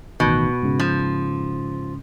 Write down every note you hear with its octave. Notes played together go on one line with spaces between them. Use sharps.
A1 B2 D#3
G#2 C#3
F3